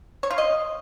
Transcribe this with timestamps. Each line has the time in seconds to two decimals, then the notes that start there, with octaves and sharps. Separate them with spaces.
0.23 C#5
0.31 F4
0.38 D#5